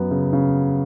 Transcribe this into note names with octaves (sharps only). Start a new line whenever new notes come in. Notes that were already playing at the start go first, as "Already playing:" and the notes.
Already playing: F#2 B3
C#3
C#3